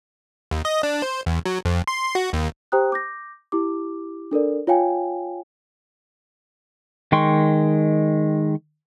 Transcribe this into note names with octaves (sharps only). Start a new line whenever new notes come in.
D#2
D#5
D4
C5
E2
F#3
F2
C6
F#4
D#2
G4 C5 G5 A#5 D#6 F#6
D6 G6 A#6
E4 G4 D6
D4 A4 A#4 D5
F4 C#5 F5 G5 G#5
D#3 G#3 G5 C6 C#6